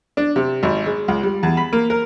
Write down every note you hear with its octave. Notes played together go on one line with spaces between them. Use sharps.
D4
C3
G#1
G#3
C#2
G3
E2
B5
A#3
A#4